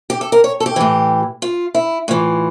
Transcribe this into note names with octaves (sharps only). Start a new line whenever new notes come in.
G4
A4
A#4
C#5
A4
G4
A2 E3
F4
E4
A2 E3 F4